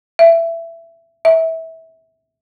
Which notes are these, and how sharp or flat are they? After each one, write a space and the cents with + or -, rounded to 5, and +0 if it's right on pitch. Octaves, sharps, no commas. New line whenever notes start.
E5 +15
E5 -20